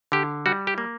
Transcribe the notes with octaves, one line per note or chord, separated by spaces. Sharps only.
D3 G4
G3 F#4
G4
A#3